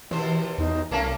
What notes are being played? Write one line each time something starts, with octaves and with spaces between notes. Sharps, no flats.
D#2 B2 E3 C5
E2 D#4
C2 A3 A#3 C#4 A5